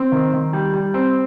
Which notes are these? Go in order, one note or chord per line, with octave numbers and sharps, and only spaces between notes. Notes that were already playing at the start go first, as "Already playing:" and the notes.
Already playing: C4
D#3
D#3
G3
G3
C4